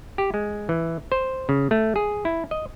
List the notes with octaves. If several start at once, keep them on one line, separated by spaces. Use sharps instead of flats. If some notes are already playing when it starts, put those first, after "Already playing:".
G4
G#3
E3
C5
C#3
A3
G#4
E4
D#5